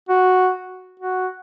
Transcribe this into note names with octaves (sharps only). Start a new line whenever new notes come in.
F#4
F#4